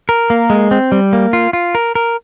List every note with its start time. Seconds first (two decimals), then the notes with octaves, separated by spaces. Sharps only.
0.09 A#4
0.30 A#3
0.50 G#3
0.71 C4
0.92 G3
1.13 A#3
1.33 F4
1.53 F4
1.75 A#4
1.95 A#4